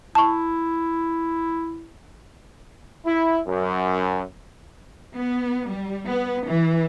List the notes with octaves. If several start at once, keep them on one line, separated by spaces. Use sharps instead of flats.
E4 A5 C#6
E4
F#2
B3
G3
B3
E3